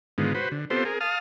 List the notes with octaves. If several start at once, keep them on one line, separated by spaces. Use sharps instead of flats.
G#2 D3 D#3 G#3 B3 F4
F#4 B4 C5
D3
B3 C4 F4 G4 A4 C5
G#4 A#4
F5 A5 D#6 F6